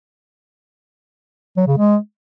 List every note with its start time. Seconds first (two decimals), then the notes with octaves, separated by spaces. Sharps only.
1.57 F#3
1.67 C#3
1.78 G#3